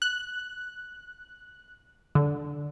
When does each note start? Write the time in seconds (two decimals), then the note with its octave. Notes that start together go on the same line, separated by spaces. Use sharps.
0.02 F#6
2.15 D3